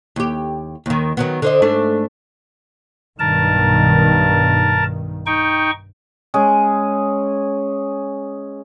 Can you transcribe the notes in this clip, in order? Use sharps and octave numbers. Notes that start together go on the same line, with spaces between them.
D#2 G4
D#2 D#3
D#3 F#3 B3
D3 C5 D#5
G#2 A3 D4
B1 G2 D#3 A#4 A5
D#4 G5 C#6
G#3 C#4 G#4